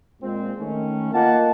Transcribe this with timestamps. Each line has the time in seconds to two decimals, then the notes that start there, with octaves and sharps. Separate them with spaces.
0.22 A#2 G#3 C4
0.59 D#3 A3 C#4
1.13 A#3 F4 D#5 F#5 A5